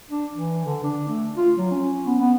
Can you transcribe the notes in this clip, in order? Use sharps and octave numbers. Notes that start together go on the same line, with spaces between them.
D4
E3
D3
D4
A3
F4
F#3
C#4
B3
B3